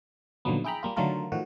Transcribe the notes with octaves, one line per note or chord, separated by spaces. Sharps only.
A#2 D3 D#3 F3 F#3 B3
E4 G#4 G5 A#5 B5
G3 A#3 F4
D3 D#3 F#3 A3 F4 A#4
A2 D#3 F3 F#4